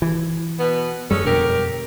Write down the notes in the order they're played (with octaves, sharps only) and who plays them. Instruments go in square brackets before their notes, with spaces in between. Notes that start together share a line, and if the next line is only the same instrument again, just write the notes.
[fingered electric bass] E3
[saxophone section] B2 B3
[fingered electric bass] F#2 G3 [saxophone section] G#3 C#4 A4
[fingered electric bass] F2 B2 D3 [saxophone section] G4 A#4